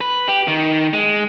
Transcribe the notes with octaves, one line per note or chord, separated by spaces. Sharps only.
B4
G4
D#3
G#3